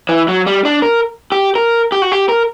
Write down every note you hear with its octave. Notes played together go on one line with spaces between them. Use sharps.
E3
F#3
G3
D4
A#4
G4
A#4
G4
F#4
G4
A#4